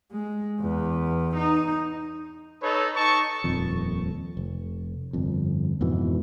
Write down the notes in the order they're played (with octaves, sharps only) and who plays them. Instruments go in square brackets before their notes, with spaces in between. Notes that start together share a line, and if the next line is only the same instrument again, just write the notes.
[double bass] G#3
E2
D#4
[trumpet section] D#4 A4 B4 C#5
D#4 A5 C#6
[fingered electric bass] D#1 F2
F1
G1 F2
F2 G#2 B2 E3